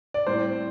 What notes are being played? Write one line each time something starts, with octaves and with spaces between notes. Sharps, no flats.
D5
A2 G3 C4 C5